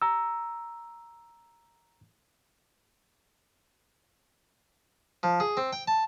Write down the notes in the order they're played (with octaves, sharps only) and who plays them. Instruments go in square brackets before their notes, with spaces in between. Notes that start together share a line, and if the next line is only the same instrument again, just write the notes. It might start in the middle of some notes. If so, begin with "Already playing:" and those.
[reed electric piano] A#5 E6
[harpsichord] F3
G#4
C4
G5
A5